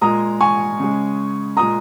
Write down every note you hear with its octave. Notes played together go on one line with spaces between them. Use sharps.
A#2 G#3 A#5 D#6
G#5 C#6
C#3 G#3
A#2 G#3 A#5 D#6